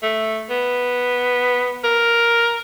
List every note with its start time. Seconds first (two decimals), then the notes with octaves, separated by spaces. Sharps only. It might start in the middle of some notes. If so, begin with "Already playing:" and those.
0.03 A3
0.50 B3
1.84 A#4